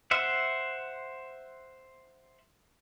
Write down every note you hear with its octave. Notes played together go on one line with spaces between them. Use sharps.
C5 E5 F#5